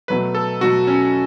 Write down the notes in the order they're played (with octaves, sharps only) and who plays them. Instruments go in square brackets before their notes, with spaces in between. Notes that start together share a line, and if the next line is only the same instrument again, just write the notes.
[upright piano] B2 F#3 A3 [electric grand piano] B4
[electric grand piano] A4
[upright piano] B2 F#3 A3 [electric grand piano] F#4
[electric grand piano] C#4